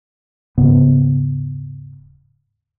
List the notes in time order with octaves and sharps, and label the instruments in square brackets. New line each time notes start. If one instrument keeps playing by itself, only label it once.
[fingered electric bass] D#1 G#2 C#3 B3